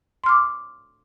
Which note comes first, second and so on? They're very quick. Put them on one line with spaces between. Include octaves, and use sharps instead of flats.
C6 F6 D6